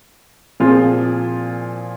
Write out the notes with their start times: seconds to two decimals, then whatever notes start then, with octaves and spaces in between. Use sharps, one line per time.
0.60 A#2 F3 C4 F4 G#4